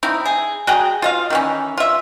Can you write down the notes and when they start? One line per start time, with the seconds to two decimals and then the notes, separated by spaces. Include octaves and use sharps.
0.03 C4 D#4 E4
0.25 G#4
0.67 F#4 G#4 G5 A#5
1.02 F4 D#5 F5
1.30 D#3 E3 C#4
1.78 F4 E5